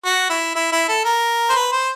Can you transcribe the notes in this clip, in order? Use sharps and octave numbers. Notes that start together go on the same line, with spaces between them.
F#4
E4
E4
E4
A4
A#4
C5
B4
C5